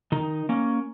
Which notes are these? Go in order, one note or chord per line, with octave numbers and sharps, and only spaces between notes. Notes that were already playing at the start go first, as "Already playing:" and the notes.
D#3 D#4
A#3 C#4